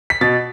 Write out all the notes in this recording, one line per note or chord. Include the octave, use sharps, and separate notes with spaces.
B6
B2 A6